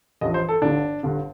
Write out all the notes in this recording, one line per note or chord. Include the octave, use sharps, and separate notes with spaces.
A1 G2 F3 D#5
C5
A4
G1 G2 D3 D4
G1 G2 D3